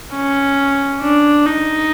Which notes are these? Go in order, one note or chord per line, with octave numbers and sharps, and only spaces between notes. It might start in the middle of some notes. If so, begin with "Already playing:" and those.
C#4
D4
D#4